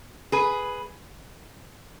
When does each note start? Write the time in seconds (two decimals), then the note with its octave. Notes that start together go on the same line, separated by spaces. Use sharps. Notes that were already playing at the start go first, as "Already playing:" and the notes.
0.32 G#4 B4